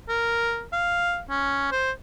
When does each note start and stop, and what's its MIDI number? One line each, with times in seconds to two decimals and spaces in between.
0.09 0.63 70
0.73 1.20 77
1.30 1.69 61
1.71 1.91 72